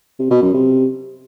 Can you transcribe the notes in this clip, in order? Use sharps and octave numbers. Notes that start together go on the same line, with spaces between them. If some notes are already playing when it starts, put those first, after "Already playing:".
C3
B2
F#2
C3